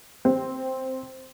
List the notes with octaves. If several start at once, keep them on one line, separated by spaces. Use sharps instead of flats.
C4